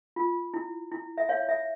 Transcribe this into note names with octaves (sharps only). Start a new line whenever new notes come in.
F4
E4
E4
E5
C#5 F5
E5